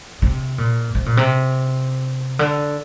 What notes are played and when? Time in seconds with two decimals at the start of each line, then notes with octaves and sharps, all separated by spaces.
0.22 C3
0.58 A#2
0.95 C3
1.06 A#2
1.17 C3
2.39 D3